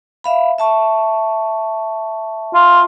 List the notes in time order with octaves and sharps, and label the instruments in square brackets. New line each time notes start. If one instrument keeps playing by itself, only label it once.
[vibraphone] E5 F5 B5
E5 A5 C#6
[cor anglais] F4